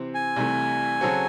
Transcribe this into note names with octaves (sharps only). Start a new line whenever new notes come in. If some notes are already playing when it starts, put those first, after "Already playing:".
Already playing: C3 E3 C4
G#5
C2 C3 E3 A3
C#3 F#3 C4 F#4 A4